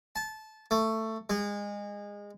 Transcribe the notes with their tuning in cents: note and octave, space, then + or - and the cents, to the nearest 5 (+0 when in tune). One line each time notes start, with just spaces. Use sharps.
A5 -20
A3 +15
G#3 -25